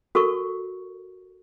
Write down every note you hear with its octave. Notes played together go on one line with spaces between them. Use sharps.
F#4 A4 A#4 C#6